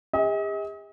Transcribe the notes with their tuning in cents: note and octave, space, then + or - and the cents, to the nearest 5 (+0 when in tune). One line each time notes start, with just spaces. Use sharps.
G#4 -45 D#5 +40